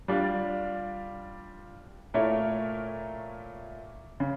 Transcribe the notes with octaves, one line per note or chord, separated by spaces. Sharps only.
G3 D4 F4
A#2 A3 E4 A#4 C#5
C#3